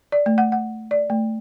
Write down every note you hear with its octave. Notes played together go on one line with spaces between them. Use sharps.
D5
A3
F#5
F#5
D5
A3